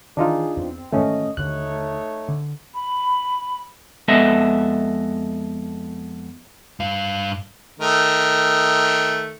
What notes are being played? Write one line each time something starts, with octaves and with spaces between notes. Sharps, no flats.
D#3 E3 D4 D#4 F4 G#4
E2 C4
G#2 D#3 E3 A3 C#4 D#5
D#2 D3 A3 D#4 C#5 F#6
D3
B5
F2 G#3 B3 A4 D#5 E5
G2 F5
D#3 A3